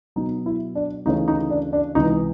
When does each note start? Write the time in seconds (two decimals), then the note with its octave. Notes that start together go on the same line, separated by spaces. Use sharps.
0.16 B2 F#3 B3 D#4
0.46 E4
0.75 D4
1.05 D2 C#3 E3 A3 C#4 D#4
1.28 D#4
1.51 D4
1.73 D4
1.95 C#2 C3 E3 D#4